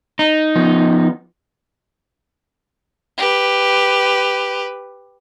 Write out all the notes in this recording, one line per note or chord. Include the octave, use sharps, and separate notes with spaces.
D#4
F3 B3
G4 B4